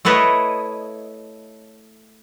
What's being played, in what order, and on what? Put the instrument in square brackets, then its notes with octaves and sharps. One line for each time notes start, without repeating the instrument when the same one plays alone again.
[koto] A3 E4 A4 B4 C#5 D#5